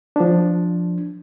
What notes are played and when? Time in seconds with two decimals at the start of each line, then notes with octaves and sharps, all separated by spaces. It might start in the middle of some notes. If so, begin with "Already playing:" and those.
0.16 F3 D4